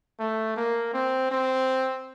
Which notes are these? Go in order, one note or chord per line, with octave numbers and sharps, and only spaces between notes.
A3
A#3
C4
C4